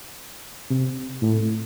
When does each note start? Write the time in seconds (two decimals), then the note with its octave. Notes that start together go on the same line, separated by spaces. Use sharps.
0.70 C3
1.22 A2